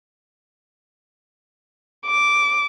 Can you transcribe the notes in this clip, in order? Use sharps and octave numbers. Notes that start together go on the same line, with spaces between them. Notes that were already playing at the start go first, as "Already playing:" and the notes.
D6